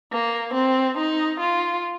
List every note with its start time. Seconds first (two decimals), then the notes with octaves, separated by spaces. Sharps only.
0.12 A#3
0.54 C4
0.97 D#4
1.40 F4